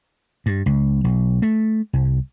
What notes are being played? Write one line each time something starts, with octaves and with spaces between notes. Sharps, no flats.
G2
C#2
B1
A3
C2